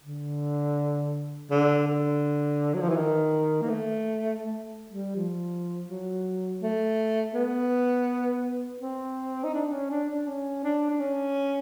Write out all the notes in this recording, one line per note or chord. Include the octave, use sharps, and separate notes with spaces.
D3
D3
D3
F#3
F3
E3
D#3
A#3
A3
A3
G3
F3
F#3
A3
B3
C4
D#4
D4
C#4
D4
D4
C#4
D4
D4
C#4